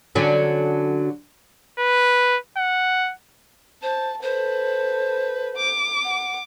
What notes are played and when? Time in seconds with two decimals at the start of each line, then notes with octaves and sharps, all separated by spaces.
0.15 D3 F#3 C#4
1.79 B4
2.57 F#5
3.83 C5 A5
4.23 A4 B4 C5
5.57 D6
6.04 F#5